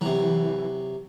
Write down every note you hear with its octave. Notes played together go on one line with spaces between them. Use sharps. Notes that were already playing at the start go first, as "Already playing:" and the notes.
C3 E3 F#3